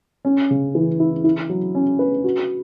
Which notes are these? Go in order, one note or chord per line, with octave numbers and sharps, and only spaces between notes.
C#4
C#3
E3
E4
E4
F#3
C#4
B4
F#4